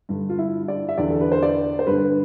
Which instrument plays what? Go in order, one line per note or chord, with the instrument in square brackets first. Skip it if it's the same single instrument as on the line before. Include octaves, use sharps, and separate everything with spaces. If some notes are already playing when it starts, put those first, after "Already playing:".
[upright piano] G2 D3
F4
E4
D5
E5
E2 D3 D5
A4
B4
C5
D5
C5
G2 D3 B4